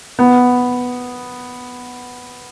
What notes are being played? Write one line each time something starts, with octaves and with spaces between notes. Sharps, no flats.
B3